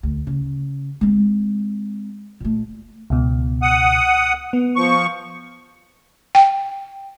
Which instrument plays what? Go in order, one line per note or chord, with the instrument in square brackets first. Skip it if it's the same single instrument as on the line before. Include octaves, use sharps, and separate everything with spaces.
[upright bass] D2
C#3
G#3 C4
A#2 A3
[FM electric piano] C#2 B2
[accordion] F#5 D#6
[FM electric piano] B3
[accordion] F3 C#6
[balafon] G5